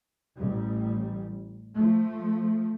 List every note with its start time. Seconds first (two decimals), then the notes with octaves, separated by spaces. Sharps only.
0.36 A1 G3
1.74 F3 A3